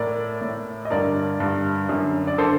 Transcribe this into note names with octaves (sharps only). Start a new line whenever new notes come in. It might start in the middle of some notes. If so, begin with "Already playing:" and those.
Already playing: A2 A#4 D5
A2
D#5
G2 D3 A#4 D5
G2 D3
F#2 D3
D5
D3 A4 C5